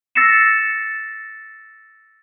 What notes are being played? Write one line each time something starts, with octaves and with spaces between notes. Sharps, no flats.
E6 A6 A#6 C7 C#7 E7